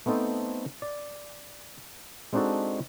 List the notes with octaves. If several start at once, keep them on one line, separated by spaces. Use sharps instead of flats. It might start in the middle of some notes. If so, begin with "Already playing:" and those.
A3 B3 C4 D#4 A4 C5
D5
G#3 C4 D4 D#4 F#4 A4